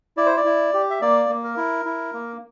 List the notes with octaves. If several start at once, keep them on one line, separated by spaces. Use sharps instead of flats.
E4 D5
C5
D5
E4
G4
E5
A#3 D5
A#3
A#4
E4
E4
A#3